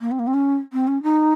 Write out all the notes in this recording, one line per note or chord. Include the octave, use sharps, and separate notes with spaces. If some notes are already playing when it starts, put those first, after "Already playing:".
A#3
C4
A#3
C4
C#4
C4
C#4
D#4